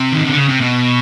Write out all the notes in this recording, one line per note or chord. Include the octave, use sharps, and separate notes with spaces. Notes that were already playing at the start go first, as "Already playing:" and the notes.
Already playing: C3
D#3
D3
C#3
C3
B2